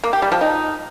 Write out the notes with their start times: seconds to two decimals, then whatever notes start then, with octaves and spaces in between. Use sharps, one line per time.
0.04 A#3
0.13 G4
0.22 G3
0.32 F3
0.41 D#4